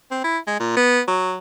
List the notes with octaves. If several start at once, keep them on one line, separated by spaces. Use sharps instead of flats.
C4
E4
G#3
A#2
B3
F#3